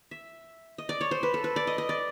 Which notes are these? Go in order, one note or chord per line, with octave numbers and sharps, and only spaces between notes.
E5
D#5
D5
C#5
C5
B4
A4
B4
D5
D#5
D#5
D5